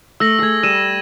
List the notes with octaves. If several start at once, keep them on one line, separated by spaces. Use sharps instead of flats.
A3 E6 A#6 F#7
A3 G#4 E6 G#6
G3 E6 D#7 E7